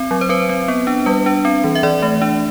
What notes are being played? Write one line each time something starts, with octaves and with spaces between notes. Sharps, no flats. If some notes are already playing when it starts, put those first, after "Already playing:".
Already playing: C4
F#3
C5
C4 B4
C4
B3
D4
G3 B4
D4
C4
E3
E5
E3 D5
A3
D4